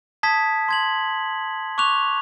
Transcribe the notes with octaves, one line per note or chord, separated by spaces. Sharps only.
A5 D#6 G#6 B6
C6 G#6 F#7
C#6 D6 F#6 F7